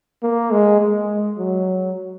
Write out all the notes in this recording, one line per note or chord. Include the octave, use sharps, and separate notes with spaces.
A#3
G#3
G#3
F#3